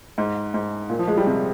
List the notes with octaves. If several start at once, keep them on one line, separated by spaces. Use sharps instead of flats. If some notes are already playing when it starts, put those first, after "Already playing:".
G#2
G#2
A#2
F3
G#3
G3
C3